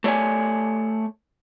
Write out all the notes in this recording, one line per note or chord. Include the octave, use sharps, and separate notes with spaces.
A3 C#5 D5 G#5